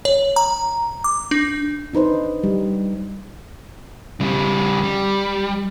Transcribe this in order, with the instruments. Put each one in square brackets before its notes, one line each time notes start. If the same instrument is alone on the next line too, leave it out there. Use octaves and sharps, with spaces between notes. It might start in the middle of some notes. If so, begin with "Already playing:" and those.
[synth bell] C#5
A#5
D6
D4
[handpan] D4 D#4 B4 C5
G3
[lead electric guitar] C#3 G3
G3